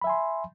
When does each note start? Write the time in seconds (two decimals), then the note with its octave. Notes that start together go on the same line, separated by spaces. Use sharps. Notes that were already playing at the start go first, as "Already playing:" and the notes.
0.01 B5
0.04 E5
0.07 G#5
0.10 C6